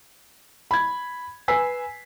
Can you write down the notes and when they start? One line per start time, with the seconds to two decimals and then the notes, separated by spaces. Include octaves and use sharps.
0.71 B5 G#6
1.48 B4 G#5 E6 B6 C7